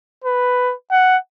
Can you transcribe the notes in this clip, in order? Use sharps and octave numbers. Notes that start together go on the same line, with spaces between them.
B4
F#5